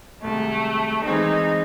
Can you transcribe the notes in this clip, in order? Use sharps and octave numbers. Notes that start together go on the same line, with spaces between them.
C2 C3 D#3 G#3 A3
E3 G#3 C4 D#4